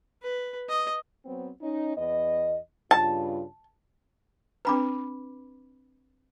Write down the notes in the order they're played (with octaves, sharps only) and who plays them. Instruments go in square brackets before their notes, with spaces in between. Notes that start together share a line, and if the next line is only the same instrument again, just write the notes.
[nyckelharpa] B4
D#5
[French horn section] F#3 B3 C4
C#4 D#4
E2 B3 D#5
[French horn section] G2 C#3 F4 [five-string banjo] A5
[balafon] C4 D4 A#5 [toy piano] B4 B5 D6